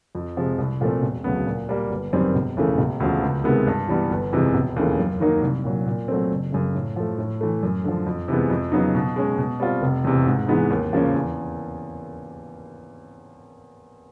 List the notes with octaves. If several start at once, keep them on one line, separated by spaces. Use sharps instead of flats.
F2
C3 F3 G#3
C2
A#2 F3 A3 C4
E1
D2 C#3 F#3 B3
A#2
G3 A#3
G1
F#2 D#3 G3 C4
E1
D#2 C#3 E3 A3
E1
D2 C#3 F3
C#2
C3 D#3 G#3 B3
G2
E3 G3 B3
G1
F2 C3 E3 G#3
E1
D#2 C#3 E3 A3
F#2
D#3 F#3 A#3 D#4
C2
A#2 F#3
A#2
F#3 A3 C4
F#1
F#2 C#3
A2
F3 A3
A2
E3 A3
F#2
D3 F3
F2
C3 E3 G#3 B3
F2
C#3 F#3 B3 D#4
B2
G#3 C#4
B2
G3 C4 F4
F1
E2 C3
G#2
E3 G#3 B3 D#4
D#2
C#3 F3 A#3 C#4
E2